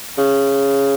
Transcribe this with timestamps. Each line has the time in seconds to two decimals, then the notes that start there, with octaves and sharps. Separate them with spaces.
0.18 C#3